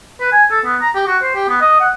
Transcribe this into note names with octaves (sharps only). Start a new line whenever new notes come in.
B4
G#5
A4
B3
A#5
G4
F#4
C5
G4
B3
D#5
F#5